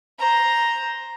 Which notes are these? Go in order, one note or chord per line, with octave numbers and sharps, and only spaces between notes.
C5 A#5